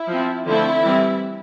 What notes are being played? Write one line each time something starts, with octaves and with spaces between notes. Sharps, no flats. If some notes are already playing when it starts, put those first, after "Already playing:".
Already playing: E4
F3 C4
D3 F3 A3 C4 E4
E3 G3 C4